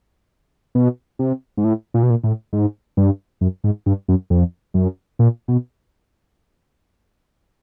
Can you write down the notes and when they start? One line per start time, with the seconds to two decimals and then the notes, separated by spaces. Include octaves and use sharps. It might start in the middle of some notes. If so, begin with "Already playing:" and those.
0.75 B2
1.19 C3
1.57 G#2
1.64 A2
1.94 A#2
2.03 B2
2.10 A#2
2.24 A2
2.53 G#2
2.97 G2
3.41 F#2
3.64 G#2
3.86 G2
4.08 F#2
4.30 F2
4.74 F#2
5.19 A#2
5.48 B2